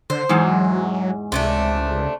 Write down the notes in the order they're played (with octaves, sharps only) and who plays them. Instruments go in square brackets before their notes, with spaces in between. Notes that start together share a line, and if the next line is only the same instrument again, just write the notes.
[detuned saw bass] D3 [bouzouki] C5
[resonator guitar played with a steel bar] E2 G#2 [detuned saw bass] F#3
[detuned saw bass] C#2 [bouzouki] C3 A3 D4